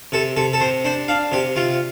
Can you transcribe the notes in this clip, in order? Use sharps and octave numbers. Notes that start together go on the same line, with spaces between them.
C3 A4
C3 A4
A4
C3 C5
D4 C5
D4 F5
C3 G4
C3 F4